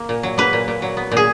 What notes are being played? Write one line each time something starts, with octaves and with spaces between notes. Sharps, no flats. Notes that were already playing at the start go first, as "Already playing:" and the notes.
Already playing: A#3
A#2
F#3
A#3 B4
A#2
A#2
F#3
B3
A#2
G#4